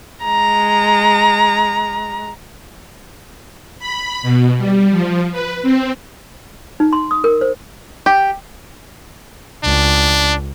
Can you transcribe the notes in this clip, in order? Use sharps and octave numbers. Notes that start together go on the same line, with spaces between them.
G#3 A#5
B5
B2
G3
F3
B4
C4
D#4
C6
D#6
A#4
C5
G4
C#2 D4